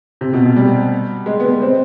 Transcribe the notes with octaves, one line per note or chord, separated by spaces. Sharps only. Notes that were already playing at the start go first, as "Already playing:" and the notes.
C3
B2
B2
G3
G#3
B3
G#3
C4